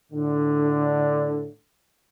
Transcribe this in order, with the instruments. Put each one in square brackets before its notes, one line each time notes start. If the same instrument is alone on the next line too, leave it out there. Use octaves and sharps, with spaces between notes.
[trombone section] A2 D3